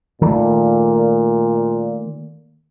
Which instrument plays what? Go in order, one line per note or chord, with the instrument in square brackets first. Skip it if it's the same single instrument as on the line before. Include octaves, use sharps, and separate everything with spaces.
[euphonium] A#2 [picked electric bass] D#3 A3 A#3